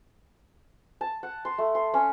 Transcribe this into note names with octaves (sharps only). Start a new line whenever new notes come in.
A5
F#5
C6
A3
C6
C#4